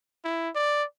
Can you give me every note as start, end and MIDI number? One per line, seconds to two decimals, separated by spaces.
0.24 0.50 64
0.55 0.84 74